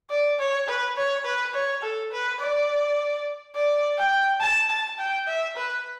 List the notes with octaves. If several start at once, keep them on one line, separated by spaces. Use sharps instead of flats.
D5
C#5
B4
C#5
B4
C#5
A4
B4
D5
D5
G5
A5
A5
G5
E5
B4